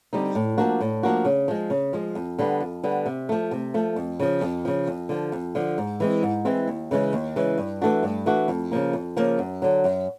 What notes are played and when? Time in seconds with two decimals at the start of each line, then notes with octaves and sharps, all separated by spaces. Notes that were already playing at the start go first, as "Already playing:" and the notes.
0.13 D3 G3 C4 D#4
0.35 A2
0.58 F3 A#3 D4 F#4
0.81 A2
1.03 F3 A#3 D4 F#4
1.25 C#3
1.48 F3 G#3
1.70 C#3
1.93 F3 G#3
2.15 F2
2.39 D3 G3 B3
2.60 F2
2.84 D3 G3 B3
3.06 C3
3.29 F3 A3
3.51 C3
3.74 F3 A3
3.96 F2
4.20 C#3 F3
4.41 F2
4.65 C#3 F3
4.87 F2
5.09 D3 F3
5.32 F2
5.55 D3 F3
5.78 G#2
6.00 E3 G#3 C4
6.23 G#2
6.45 E3 G#3 C4
6.68 D#2
6.91 C#3 E3 G#3 C#4
7.13 D#2
7.36 C#3 E3 G#3 C#4
7.58 G2
7.82 E3 A3 D4 F#4
8.03 G2
8.26 E3 A3 D4 F#4
8.48 F2
8.71 C#3 F3 A#3
8.93 F2
9.17 C#3 F3 A#3
9.39 F#2
9.62 D3 F#3
9.84 F#2